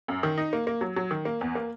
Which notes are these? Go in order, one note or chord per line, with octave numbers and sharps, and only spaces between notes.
F#2
D#3
D#4
A#3
A#3
F#3
F#3
D#3
A#3
E2
A#3